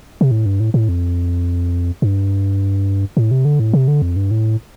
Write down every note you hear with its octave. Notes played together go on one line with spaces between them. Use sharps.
C3
A2
G2
A2
A2
F2
G2
A2
C3
D3
A2
C3
D3
F2
G2
A2